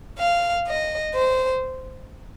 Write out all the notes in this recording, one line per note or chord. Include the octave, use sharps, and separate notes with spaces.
F5
D#5
C5